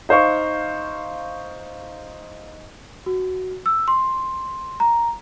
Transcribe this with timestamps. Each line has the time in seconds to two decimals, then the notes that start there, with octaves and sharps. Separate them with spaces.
0.09 D#4 C5 F5 C#6
3.06 F#4
3.66 E6
3.88 C6
4.80 A#5